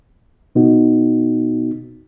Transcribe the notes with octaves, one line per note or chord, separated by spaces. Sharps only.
B2 B3 D#4 F#4